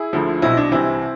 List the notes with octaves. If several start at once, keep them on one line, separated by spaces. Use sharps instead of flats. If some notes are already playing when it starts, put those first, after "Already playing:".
Already playing: E4 G#4
D2 D3 F3
B1 B2 C4 E4
D4
C2 C3 E3 C4 E4